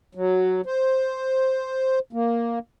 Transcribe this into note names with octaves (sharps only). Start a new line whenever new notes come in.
F#3
C5
A#3